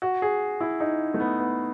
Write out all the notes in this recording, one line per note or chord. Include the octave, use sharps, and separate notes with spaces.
F#4
G#4
E4
D#4
A3
B3
B3